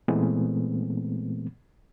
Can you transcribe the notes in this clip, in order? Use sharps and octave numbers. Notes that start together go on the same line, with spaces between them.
A#2 E3 G#3 A3 B3 C4